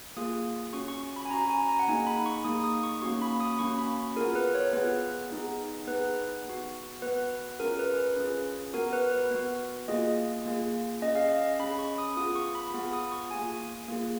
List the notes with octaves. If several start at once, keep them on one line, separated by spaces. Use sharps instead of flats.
A#3 F4 G#4 D#6
C#4 F#4 C#6
C#6
C#6
B5
G#5
C#4 F#4 A#5
G#5
A#5
F#5
A#3 D#4 G#4 G#5
B5
C#6
A#3 D#4 G#4 D#6
D#6
C#6
A#3 C#4 F#4 C#6
B5
D#6
A#3 C#4 F#4 C#6
B5
B3 F4 G#4 A#4
B4
C#5
B3 F4 G#4 B4
B3 D#4 G#4
B3 D#4 G#4 B4
B3 F#4
B3 F#4 B4
C#4 F4 G#4 A#4
B4
B4
C#4 F4 G#4
B3 F#4 A#4
B4
B4
B3 F#4
A#3 F4 G#4 D#5
A#3 F4 G#4
C#4 G#4 D#5
F5
D#5
C#4 G#4 B5
C#6
D#6
B3 F4 G#4 D#6
C#6
B5
B3 F4 G#4
D#6
C#6
A#3 F4 G#4 G#5
A#3 F4 G#4